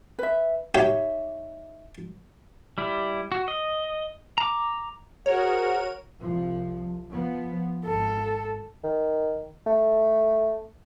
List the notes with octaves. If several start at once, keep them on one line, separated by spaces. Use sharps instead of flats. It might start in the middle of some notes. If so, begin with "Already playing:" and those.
B4 E5
D#4 G4 C#5 E5
G3 E4
F#4
D#5
A#5 D6
F#4 G#4 A#4 C5 C#5 F#5
C2 F3
F3 B3
G#1 A4
D#3
A3